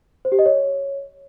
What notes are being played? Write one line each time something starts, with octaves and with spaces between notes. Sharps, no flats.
C5
G4
D#5
C#5